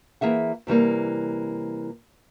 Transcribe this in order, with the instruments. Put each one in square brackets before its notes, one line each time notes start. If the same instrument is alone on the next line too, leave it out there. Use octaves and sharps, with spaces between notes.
[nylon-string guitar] E3 A#3 G#4 E5 F#5
C3 E3 G3 A#3